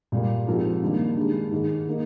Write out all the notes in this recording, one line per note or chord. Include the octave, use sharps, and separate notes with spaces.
A#2 G3 A#3
G#2 F3 C4 F4 A#4
G2 D#3 G3 A#3
G2 D#3 G#3
G#2 D#3 G#3
D#3 A#3 D#4 A#4